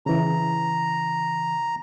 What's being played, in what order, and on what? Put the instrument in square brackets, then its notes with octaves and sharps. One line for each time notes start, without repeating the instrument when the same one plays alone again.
[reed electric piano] C#3 E3 [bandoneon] A#5